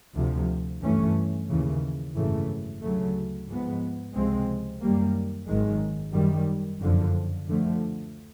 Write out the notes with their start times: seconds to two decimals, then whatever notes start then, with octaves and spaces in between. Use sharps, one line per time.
0.16 D2 C3 F3
0.82 G2 E3 A3 C#4
1.50 D#2 C#3 E3
2.15 G#1 F#2 C#3 E3 A3
2.82 D2 C#3 F#3 A3
3.48 G#2 F3 G#3 B3
4.15 C#2 C3 F3 G#3 C4
4.81 F#2 D#3 G3 A#3
5.48 G#1 F#2 D#3 G#3
6.14 F#2 D#3 G3
6.81 F#1 F2 D3 F3
7.47 D2 D3 F3 A3